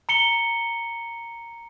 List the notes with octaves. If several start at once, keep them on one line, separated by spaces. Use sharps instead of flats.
A#5 C#7 G7